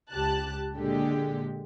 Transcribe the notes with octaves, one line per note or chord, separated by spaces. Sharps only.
C#2 G4 A5 F#6
A#2 D3 G#3 G4